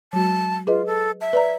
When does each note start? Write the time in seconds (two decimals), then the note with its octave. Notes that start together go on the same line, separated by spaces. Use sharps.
0.13 F#3 G#3 F#4 A5
0.67 F4 G#4 B4 D#5
0.86 A4
1.21 E5 A5
1.33 B4 D5 A#5